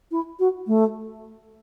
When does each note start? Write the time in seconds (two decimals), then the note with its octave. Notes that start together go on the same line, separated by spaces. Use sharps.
0.11 E4
0.39 F#4
0.67 A3